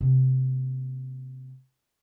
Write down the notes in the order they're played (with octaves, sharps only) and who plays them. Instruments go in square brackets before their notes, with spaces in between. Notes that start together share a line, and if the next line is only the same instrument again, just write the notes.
[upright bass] C3 A#3